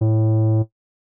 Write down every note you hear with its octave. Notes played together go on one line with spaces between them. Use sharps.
A2